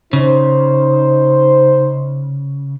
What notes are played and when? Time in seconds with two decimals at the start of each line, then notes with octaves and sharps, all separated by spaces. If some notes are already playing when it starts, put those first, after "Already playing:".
0.13 C#3 D#4 C5